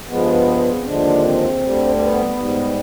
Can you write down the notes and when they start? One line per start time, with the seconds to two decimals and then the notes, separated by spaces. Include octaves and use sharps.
0.09 G2 F3 G#3 B3
0.78 C4
0.85 D#2 D3 F3 G#3 D4
1.23 C4
1.62 D2 D3 G3
1.99 B3
2.37 G#2 G3